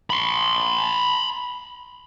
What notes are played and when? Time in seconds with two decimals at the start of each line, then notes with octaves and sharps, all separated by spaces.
0.10 B5 C6